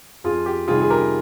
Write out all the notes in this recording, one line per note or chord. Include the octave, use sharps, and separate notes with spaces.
F2 F4 G#4
G4
C3 D#3 G3 F4 G#4
G#4
G4 A#4